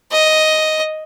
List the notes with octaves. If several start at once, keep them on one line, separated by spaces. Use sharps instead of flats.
D#5